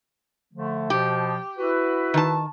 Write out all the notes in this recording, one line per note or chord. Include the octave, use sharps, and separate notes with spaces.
D3 F3 A3
B2 F3 G4
E4 F#4 B4
D#3 A5